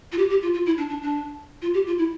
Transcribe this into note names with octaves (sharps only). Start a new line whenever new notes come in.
F4
G4
G4
F4
F4
E4
D4
D4
D4
F4
G4
F4
E4